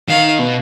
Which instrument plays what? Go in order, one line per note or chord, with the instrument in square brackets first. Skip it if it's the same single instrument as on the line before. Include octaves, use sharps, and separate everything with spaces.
[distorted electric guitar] D#3 [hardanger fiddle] F5
[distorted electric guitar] B2